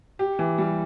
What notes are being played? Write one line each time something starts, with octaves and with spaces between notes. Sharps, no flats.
G4
E3
G3